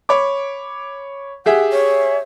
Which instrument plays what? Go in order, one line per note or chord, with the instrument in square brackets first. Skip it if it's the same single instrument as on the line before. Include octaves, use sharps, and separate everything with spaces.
[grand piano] C#5 B5 D6
[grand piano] G4 G#4 E5 [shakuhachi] F#5
[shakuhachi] C#5